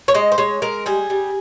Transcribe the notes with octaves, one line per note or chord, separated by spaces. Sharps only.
C#5
G#3 D#5
C5
G#3 C#5
G#3 A#4
G3 G#4
G3